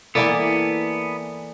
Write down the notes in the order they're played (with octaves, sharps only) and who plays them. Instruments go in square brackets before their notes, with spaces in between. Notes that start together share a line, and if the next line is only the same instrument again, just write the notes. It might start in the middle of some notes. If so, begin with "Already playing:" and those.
[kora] E3 A#3 E4 [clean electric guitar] B3 [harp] A4 D5 G#5